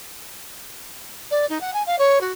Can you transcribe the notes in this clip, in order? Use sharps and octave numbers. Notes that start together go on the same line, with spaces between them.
D5
D#4
F#5
G#5
F5
C#5
F#4